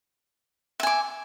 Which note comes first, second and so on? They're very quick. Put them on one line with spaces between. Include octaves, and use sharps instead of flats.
E5 G#5 D6